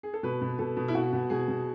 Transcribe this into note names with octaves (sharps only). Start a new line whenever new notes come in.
G#4
A4
B2 B4
B2
B2 A4
B2
E4
B2 F#4
B2
B2 G#4
B2